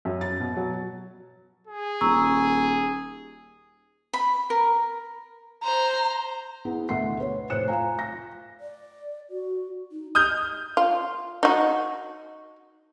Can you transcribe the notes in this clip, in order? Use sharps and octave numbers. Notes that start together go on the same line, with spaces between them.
F#2
A6
B2
F#3
G#4
D#1 A#5 C#6 E6
B5
A#4
C5 A#5
B3 E4 G#4
D2 B2 E5 F#5 C6 C7
B4 C#5
F1 A2 C5 F#6 C#7 E7
F4 F5 G#5 A#5
A#6
D5
F#4
D#4
D#5 D#6 F6 G6
F4
D#4 F#4